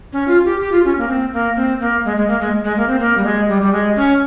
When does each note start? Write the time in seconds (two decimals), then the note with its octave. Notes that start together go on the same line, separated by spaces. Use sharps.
0.13 C#4
0.28 F4
0.45 G4
0.61 G4
0.72 F4
0.85 C#4
0.98 A#3
1.08 C4
1.33 A#3
1.57 C4
1.80 A#3
2.05 G#3
2.17 G#3
2.28 A#3
2.40 G#3
2.64 G#3
2.77 A#3
2.88 C4
3.00 A#3
3.17 G3
3.25 G#3
3.48 G3
3.62 G3
3.72 G#3
3.96 C#4